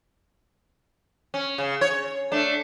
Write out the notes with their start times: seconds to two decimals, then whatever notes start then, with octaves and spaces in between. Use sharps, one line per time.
1.34 C#4
1.58 C#3
1.81 C#5
2.32 A3 D4